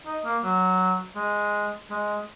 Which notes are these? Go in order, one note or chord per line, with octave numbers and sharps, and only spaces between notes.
D#4
A#3
F#3
G#3
G#3